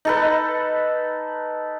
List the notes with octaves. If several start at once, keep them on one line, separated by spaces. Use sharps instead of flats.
D#4 A4 B4